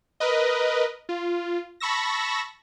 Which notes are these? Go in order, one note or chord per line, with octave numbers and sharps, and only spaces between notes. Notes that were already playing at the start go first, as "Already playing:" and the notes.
A#4 B4 D#5
F4
A5 B5 C#6 E6 A#6